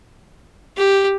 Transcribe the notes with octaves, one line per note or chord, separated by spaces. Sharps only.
G4